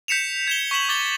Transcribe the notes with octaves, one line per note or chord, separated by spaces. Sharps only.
G6 B6 C#7 E7 F7
G#6 E7 G7
C#6 B6 E7 F#7
D6 A6 G7